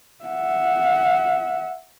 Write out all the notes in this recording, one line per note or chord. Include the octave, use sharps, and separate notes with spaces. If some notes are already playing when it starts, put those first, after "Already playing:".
E5 F#5